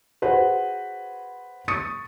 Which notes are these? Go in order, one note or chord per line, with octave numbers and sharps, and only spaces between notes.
F#4 G#4 B4 C5
C#6 D#6 A6 C#7 D#7